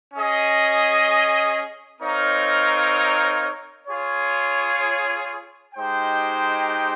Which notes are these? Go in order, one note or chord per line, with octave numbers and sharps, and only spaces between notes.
C#4 G#4 D#5
C4 D#4 A#4 C#5 F5
F4 G#4 C#5
G#3 D#4 G4 C5 G5